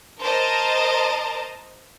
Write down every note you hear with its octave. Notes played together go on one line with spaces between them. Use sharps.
A#4 C5 D#5 A5 A#5